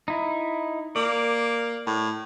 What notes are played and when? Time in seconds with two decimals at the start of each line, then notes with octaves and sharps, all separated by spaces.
0.08 D#4 E4
0.96 A#3 D5
1.87 A2